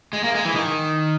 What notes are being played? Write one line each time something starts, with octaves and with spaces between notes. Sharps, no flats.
G#3
A#3
G#3
E3
D#3